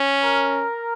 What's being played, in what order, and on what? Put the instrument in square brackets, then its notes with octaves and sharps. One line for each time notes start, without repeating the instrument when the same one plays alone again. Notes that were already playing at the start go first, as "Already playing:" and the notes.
Already playing: [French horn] C#4
[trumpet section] A#4